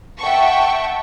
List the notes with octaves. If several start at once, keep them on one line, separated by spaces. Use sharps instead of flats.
E5 F#5 G5 A5 C#6